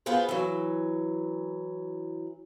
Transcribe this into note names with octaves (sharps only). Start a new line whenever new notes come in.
B3 F4 G#4 B4 C5
E3 F#3